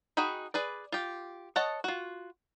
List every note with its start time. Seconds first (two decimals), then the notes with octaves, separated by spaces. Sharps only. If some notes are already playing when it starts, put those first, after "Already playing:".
0.17 D#4 F#4 G#4 G5 B5
0.54 G#4 B4 D5
0.92 F4 G4
1.56 A4 C#5 D#5 F#5 A5
1.84 F4 F#4